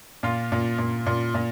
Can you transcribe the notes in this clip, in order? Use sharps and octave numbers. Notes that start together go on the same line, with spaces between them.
A#2 F4
A#2
A#2
A#2
A#2